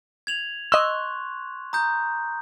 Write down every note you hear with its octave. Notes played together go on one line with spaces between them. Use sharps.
G#6 F7 F#7
D#5 C6 C#6 E6 F#6
A#5 D#6 G6